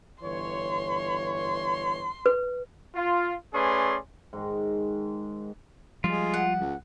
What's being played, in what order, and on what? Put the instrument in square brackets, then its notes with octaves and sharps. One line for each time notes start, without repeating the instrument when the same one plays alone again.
[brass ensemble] G1 E3 C#5 [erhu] C6
[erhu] C6
[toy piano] B4
[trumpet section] F4
A3 C#4 G#4 B4 D5 C6
[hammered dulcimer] G#2 D#3 G#3
[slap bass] F3 G3 [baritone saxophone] G#3 [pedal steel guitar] F4
[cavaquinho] F#5
[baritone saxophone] C#2